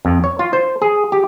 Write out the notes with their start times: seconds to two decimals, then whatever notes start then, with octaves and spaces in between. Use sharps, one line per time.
0.05 F2
0.24 C#5
0.39 F4
0.53 C5
0.82 G#4
1.12 G4